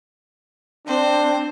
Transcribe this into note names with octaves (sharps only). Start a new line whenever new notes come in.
C4 D4 C5